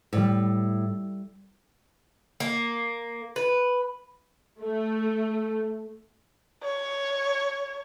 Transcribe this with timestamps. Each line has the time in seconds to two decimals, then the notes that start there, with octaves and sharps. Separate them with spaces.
0.13 A2 G3 D5 B6
2.40 A#3
3.36 B4
4.61 A3
6.63 C#5